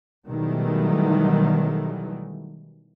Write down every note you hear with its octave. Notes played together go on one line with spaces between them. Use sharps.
B2 D#3 E3 F#3 G3 A3